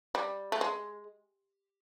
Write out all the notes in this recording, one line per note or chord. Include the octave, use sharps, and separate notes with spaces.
G3
A3
G#3